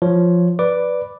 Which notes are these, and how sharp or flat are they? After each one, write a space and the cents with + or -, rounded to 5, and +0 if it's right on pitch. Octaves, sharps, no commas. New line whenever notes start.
F3 +0 C#5 +0
B4 +0 D5 +0 D6 +0